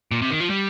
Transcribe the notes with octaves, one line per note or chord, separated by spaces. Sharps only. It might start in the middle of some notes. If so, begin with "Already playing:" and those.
A#2
C3
D#3
F3
G3